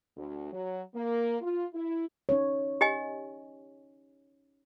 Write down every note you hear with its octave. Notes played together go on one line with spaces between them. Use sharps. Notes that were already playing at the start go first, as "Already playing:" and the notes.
D2
F#3
A#3
F4
E4
C#4 D#4 C#5
G4 D#5 G#5